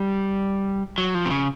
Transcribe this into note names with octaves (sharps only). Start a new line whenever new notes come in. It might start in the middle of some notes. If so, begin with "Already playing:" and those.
Already playing: G3
F#3
F3
C3
C#3